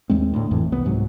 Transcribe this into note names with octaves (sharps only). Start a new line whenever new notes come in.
D#2 G#3 C4
D2 A2
G#1 F2 A2 E3
C2 B3
C2 G#2 C3 F#3